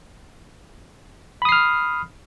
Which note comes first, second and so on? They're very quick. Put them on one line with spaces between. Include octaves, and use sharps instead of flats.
B5 D#6 C7 F6